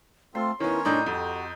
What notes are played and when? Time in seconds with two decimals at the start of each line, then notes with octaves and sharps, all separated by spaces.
0.35 A3 C4 F4 A4 C6
0.60 D#3 B3 C#4 E4 A#4 C#5
0.85 A2 D4 D#4 D5 D#5 G5 A#5
1.06 F2 F#4 G4 A4